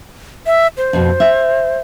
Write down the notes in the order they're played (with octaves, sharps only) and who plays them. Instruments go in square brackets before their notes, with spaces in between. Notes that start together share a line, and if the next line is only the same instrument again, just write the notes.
[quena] E5
C5
[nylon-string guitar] F2 B2
E5